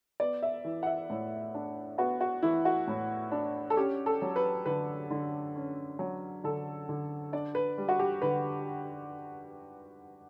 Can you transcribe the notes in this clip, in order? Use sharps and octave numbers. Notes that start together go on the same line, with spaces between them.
B3 D5
E5
E3
F#5
E5
A2
D4
B3 F#4
F#4
E3 E4
F#4
A2
D4
A4
C#4 G4
A4
F#3
B4
D3 B4
D3
C#4
F#3
D3 A4
D3
D4 D5
B4
G3
F#4
G4
D3 B4